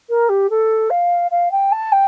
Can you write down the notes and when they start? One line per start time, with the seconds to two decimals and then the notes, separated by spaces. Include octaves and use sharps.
0.09 A#4
0.29 G4
0.50 A4
0.90 F5
1.31 F5
1.51 G5
1.72 A5
1.92 G5